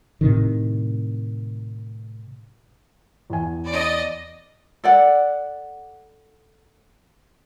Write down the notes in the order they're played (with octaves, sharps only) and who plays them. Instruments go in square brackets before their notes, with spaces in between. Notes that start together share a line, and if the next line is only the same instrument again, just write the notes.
[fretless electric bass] A2 C3 D#3
[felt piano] E2 G#5
[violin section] D5 D#5
[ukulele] A4 D5 F#5